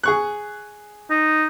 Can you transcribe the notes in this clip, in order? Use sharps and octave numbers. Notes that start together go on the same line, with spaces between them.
G#4 C#6 F#6
D#4